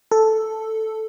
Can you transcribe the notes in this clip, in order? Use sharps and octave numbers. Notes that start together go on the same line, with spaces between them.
A4